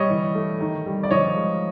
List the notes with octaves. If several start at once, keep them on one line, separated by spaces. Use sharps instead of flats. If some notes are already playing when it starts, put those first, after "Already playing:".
Already playing: G3 C#5 D#5
E3
A3
D#3
G3
D5
F3 C#5 D#5
G#3